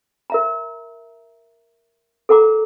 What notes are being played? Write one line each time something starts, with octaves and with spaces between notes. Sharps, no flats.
A#4 E5 A#5
A4 A#4 F#5 A#5 D6